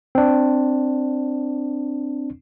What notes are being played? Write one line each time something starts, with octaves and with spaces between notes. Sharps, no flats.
C4 D4